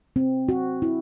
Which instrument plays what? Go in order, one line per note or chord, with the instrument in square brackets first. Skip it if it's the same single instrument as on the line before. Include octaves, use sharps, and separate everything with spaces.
[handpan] C4
F#4
E4